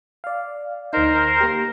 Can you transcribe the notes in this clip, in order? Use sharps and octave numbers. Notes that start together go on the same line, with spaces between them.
D5 F5
D2 D#4 A#4 C5
A#3 G4